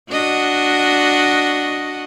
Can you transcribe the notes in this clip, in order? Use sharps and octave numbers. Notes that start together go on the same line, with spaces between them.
D4 F#4 D#5